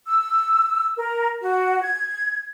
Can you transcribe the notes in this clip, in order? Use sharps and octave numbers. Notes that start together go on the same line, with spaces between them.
E6
A#4
F#4
G#6